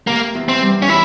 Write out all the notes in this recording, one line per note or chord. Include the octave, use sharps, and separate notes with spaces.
C3 A#3
E2
C4
G3
C#4
E3 E4